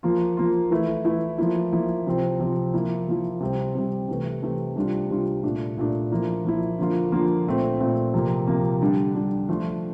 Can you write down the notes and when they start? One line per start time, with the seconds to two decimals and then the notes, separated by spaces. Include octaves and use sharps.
0.03 F3 A#3 F4
0.37 F3 A#3 F4
0.71 E3 A3 E4
1.05 E3 A3 E4
1.38 F3 A#3 E4
1.73 F3 A#3 E4
2.07 C3 F3 C4
2.39 C3 F3 C4
2.74 F3 A#3 E4
3.08 F3 A#3 E4
3.40 C3 G3 C4
3.74 C3 G3 C4
4.08 C3 E3 A3
4.43 C3 E3 A3
4.76 C3 G3 D4 F4
5.10 C3 G3 D4 F4
5.43 A#2 A3 D4
5.77 A#2 A3 D4
6.11 F3 A#3 E4
6.45 F3 A#3 E4
6.79 D3 F3 A#3 F4
7.12 D3 F3 A#3 F4
7.47 A#2 A3 C4
7.80 A#2 A3 C4
8.14 C3 F3 A#3
8.47 C3 F3 A#3
8.81 D3 G3 D4
9.15 D3 G3 D4
9.49 F3 A3 D4 F4